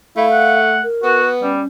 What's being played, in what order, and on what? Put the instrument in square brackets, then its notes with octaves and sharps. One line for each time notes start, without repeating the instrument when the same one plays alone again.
[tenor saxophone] A3 [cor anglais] E4 [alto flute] F5
[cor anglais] F#5
[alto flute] A#4
[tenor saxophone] B3 [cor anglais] F#4
[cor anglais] G3 [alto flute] C#4